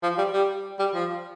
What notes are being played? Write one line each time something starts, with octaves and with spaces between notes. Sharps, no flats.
F3
G3
G3
G3
F3